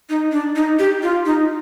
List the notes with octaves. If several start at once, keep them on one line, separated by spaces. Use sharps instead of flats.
D#4
D4
D#4
G4
F4
D#4